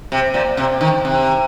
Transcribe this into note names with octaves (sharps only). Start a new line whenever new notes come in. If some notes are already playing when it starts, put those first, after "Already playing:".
C3
A#2
C3
D#3
C3